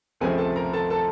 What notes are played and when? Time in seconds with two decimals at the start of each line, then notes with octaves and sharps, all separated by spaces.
0.21 C#2 C3 F3 A3 C4 G#4 G#5
0.38 A4 A5
0.56 A#4 A#5
0.73 A4 A5
0.90 A4 A5